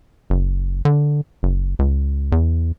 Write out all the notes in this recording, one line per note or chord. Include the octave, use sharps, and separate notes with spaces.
F#1
D3
F#1
C#2
E2